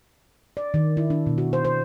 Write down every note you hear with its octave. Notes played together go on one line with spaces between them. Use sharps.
D5
D#3
E4
D4
B2
F#4
C5
C5